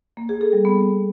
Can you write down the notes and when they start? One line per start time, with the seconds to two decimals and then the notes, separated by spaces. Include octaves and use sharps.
0.17 A#3
0.29 G#4
0.41 A4
0.53 G3
0.65 B3